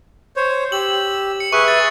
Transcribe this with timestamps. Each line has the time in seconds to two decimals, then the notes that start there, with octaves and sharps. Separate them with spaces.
0.36 C5 C#5
0.72 G4 E6 F#7
1.40 C#7
1.52 G#4 B4 E5 C#6 F#6
1.68 A6